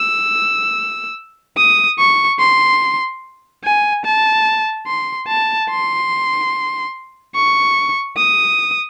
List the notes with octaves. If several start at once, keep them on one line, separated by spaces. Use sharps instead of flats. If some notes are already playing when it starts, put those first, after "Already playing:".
Already playing: E6
D#6
C#6
C6
G#5
A5
C6
A5
C6
C#6
D#6